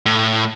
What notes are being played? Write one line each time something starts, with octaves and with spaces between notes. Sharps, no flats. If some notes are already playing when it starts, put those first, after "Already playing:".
A2